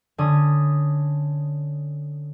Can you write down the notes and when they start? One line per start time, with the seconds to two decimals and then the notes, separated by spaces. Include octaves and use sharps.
0.18 D3 C#4 D#6